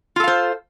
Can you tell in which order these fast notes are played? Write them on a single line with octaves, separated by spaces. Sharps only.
F4 A4 F5 C5